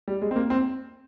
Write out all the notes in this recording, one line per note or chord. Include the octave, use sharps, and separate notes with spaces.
G3
G#3
C4
A#3
C4